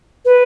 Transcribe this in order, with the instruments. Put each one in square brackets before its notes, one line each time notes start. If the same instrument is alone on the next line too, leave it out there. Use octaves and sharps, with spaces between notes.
[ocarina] B4